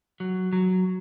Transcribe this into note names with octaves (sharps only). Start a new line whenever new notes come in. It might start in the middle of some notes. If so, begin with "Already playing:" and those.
F#3
F#3